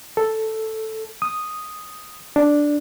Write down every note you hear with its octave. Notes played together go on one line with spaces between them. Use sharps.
A4
D#6
D4